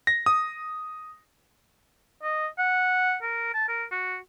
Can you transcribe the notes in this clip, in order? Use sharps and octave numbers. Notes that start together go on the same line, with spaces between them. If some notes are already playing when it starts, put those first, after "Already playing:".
A#6
D#6
D#5
F#5
A#4
A5
A#4
F#4